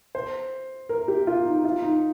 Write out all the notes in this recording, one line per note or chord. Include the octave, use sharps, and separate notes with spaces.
C5
A#4
G4
F4
D#4
F4
D#4